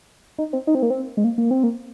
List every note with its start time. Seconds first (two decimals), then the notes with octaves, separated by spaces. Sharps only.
0.38 D#4
0.53 C4
0.67 D#4
0.75 C4
0.82 A#3
0.90 C4
1.17 G#3
1.24 A#3
1.38 A#3
1.51 C4
1.63 A#3